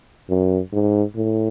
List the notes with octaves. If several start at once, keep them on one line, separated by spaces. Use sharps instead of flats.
F#2
G#2
A2